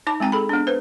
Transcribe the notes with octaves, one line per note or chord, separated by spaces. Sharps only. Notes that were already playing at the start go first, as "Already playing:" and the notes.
D#4 A5 D6
G#3 C4 G5 A#5
G#4 A4 B5
B3 D4
B4 C5